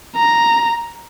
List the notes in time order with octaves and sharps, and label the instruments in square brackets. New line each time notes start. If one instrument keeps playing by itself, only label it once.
[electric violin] A#5